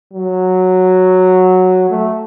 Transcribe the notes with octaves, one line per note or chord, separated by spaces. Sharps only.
F#3
A3